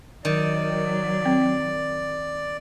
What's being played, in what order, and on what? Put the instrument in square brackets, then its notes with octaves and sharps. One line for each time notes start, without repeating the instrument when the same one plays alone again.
[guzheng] D#3 [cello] F#3 [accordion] D5
[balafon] C4